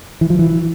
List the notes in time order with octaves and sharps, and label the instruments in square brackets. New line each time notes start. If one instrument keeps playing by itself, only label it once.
[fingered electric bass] E3
F3
E3